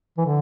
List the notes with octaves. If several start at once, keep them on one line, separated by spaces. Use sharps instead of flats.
E3
D3